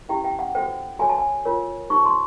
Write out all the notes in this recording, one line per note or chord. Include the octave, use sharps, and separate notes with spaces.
C#4 E4 G4 G5
G5
F#5
F#4 A4 C5 G5
F#4 A4 C#5 G#5
A5
G#5
F4 A#4 C#5
D#4 G4 C5 C#6
C6